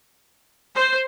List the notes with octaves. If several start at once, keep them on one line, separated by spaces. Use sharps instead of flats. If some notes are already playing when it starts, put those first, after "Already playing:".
C5